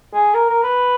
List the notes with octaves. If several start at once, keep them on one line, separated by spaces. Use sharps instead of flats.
G#4
A#4
A#4
B4